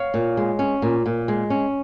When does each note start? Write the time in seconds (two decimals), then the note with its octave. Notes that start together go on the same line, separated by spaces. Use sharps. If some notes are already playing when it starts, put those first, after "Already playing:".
Already playing: C#5 F5
0.14 A#2
0.37 G#3
0.59 C#4
0.82 A#2
1.06 A#2
1.28 G#3
1.50 C#4